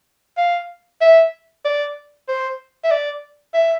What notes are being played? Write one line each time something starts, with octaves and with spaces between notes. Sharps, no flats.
F5
E5
D5
C5
E5
D5
E5